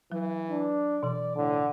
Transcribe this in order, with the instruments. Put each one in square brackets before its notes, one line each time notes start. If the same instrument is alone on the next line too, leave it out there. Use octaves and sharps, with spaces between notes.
[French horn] E3 [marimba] F#3
[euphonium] D4
[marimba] B2 E3 [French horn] D5
[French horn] A2 [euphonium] D3